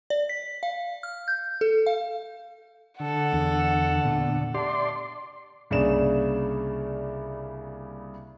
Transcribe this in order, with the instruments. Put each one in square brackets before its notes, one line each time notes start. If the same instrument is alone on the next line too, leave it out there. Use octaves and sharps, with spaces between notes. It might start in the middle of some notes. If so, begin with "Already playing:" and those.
[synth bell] D5
B6
F5
F6
G6
A4
F5
[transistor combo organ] D3 [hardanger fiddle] A4 F#5
[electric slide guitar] E2
A#2 A3 B3
[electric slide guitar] G4 E5 A5 [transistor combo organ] D5 C6
[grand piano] C2 C#3 A#3 D4 D5 E7